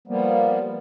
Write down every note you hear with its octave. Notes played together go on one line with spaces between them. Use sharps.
F3 G3 A#3 B3